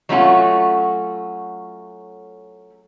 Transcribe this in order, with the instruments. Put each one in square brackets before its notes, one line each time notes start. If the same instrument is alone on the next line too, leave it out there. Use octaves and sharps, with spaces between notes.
[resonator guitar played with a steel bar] F#3 A3 C#4 F4 F#4